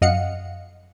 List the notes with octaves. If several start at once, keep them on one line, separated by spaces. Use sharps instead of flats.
F#2 D#5 F5 F#5 C#7